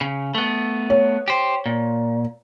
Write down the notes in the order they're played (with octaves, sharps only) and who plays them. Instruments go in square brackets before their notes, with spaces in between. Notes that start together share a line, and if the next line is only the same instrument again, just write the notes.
[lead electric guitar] C#3
A3 B3
[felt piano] C#5
[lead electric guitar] G4 C5
A#2